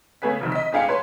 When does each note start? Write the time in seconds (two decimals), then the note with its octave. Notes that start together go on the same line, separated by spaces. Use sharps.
0.22 C#3 A3 B3 G#4 B4 B6
0.41 F1 C2 D#3
0.52 D#5 B6
0.72 G#2 D4 G#4 F5 G5 C#7
0.88 B4 C#5 A5 C6